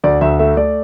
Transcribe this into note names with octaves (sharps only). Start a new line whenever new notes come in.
D2 D5
D2 E5
A3 E5
A3 D5